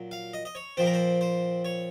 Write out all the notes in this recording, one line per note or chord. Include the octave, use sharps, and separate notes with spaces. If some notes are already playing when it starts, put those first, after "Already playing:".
Already playing: A#2 F#3
F5
D#5
D#5
C#5
A#2 F3 C4 C5
A#4
C5
C5
C#5